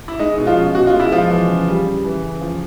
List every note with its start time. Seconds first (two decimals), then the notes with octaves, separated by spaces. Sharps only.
0.08 E4
0.19 G#3 D#4
0.38 B2
0.47 F3 F4
0.57 C#4
0.75 B2 F#4
0.87 F4
0.94 G#3
1.00 E4
1.12 B2 F3 F4
1.31 E3
1.49 C#3
1.68 G3
1.86 C#3
2.04 E3
2.23 C#3
2.41 F3